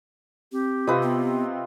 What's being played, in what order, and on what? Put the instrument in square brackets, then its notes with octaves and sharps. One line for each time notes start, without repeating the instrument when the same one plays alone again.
[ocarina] C4 [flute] G4
[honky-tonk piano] C3 [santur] F4 B4 D#5
[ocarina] B3